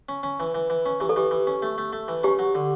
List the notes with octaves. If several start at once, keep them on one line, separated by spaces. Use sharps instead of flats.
C#4
C#4
E3
E3
E3
C#4
E3 G4
A4
E3 G4
E3
C#4
A3
A3
A3
E3
C#4 G4
F#3
D3